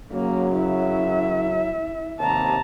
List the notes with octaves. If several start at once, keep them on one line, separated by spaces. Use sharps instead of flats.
F#2 C#3 F#3 A#3
E4 E5
D#2 C3 A5 A#5